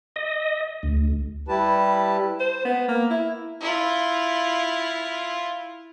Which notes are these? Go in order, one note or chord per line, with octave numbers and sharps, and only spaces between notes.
D#5
D2
G3 E4 G4 B4 A5
C5
B3
A#3
E4
E4 F4